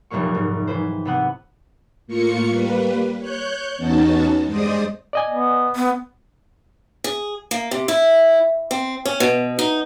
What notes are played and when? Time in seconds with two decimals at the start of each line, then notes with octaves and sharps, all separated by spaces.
0.10 F1 C2 G2 A#2 A#3 C#6
0.35 G#2
0.67 E3 B4 C5
1.05 C3 B3 F#5
2.07 A2 A#3 F4 C#6 C#7
2.48 G3 A#3 B4
3.19 C#5 F#6 G6
3.77 E2 B3 C#4 D#4 F#4 A5
4.46 G2 G#3 C5 D5 D#5 D#6
5.13 D5 D#5 G#5
5.30 B3
5.76 B3
7.04 G#4
7.51 A#3
7.71 C3
7.88 E4
8.71 C4
9.05 C#4
9.20 B2
9.59 D#4